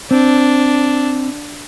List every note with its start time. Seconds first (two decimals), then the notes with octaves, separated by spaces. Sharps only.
0.11 C4 D4